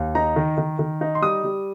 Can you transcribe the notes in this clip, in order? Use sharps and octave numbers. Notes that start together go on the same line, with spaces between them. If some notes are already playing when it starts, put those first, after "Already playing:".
Already playing: D#2
D#4 A#5
D#3
D#3
D#3
D#4
C6
G3 D#6
G3